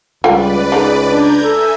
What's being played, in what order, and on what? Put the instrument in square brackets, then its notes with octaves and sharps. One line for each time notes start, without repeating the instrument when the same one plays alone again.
[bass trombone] C#2 [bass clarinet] G3 [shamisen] F4 G5 [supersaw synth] B4 D5
[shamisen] G#3 D#4 [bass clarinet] G#4
[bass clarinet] D4 [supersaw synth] A#5 G6 G#6
[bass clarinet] A4 [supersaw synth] E5 G#5